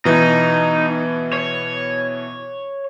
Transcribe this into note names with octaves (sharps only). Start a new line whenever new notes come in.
B2 E3 D#4
C#5